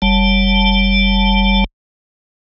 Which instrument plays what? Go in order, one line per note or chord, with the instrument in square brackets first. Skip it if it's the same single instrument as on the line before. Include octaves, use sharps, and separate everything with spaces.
[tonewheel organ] F#1 G3 A5